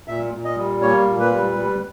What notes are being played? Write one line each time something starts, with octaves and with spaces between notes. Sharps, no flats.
A#2 E5
A#2
D#5
G3
A#3 C#5
A#2
B4
G3
G3